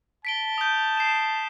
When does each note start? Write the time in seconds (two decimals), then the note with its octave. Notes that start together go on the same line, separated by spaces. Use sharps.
0.25 A5 B6 D7 G7
0.58 D#6 G6
0.97 C7 E7